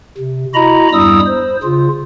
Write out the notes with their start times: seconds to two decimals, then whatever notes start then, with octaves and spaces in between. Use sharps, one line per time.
0.18 C3
0.54 E4 F#4 D#5 A#5 B5
0.93 E2 G2 G3 E4 D#6 E6
1.27 C5
1.63 C#3 F4